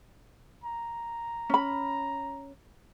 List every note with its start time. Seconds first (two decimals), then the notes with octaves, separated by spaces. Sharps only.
0.64 A#5
1.50 C#4 B5